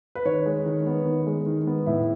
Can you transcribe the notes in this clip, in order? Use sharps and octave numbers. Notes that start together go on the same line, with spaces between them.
B4
D#3 C#5
G#3
D#3
B3
D#3
G#3
D#3
B3
A2 E4